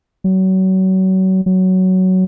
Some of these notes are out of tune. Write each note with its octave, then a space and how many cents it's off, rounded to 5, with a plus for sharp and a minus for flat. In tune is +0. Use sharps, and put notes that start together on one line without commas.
F#3 +30
F#3 +10